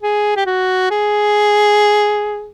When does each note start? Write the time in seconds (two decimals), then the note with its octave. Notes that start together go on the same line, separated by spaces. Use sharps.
0.03 G#4
0.36 G4
0.46 F#4
0.90 G#4